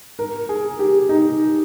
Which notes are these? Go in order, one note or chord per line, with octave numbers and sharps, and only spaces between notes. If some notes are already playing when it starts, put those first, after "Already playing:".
A#4
G#4
G4
D#4